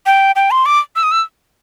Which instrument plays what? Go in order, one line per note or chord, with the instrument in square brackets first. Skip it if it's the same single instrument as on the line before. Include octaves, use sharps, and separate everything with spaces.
[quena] G5
G5
C6
D6
E6
D#6
E6